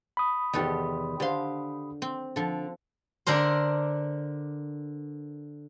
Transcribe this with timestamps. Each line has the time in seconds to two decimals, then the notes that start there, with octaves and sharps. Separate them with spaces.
0.17 B5 D#6
0.53 E2 C3 D#3 F#4 G4 A4
1.20 D3 G4 C5 F5 C6
2.02 C4
2.36 D3 F3 A4
3.27 D3 D4 A#4 C5